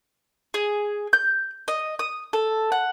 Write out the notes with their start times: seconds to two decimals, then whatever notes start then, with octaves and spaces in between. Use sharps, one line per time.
0.54 G#4
1.13 G6
1.68 D#5
1.99 D#6
2.33 A4
2.72 F#5